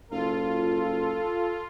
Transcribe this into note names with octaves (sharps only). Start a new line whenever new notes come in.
F#1 F4 A4